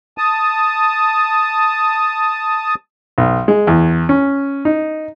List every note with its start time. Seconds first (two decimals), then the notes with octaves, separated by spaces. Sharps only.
0.18 A5 D#6
3.18 B1
3.48 G#3
3.67 E2
4.09 C#4
4.65 D#4